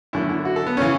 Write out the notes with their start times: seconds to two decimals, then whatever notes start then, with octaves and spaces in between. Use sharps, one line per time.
0.13 F#2 D3 A3 E4
0.29 E4
0.45 F#4
0.56 A4
0.67 B3
0.77 C#3 E3 C#4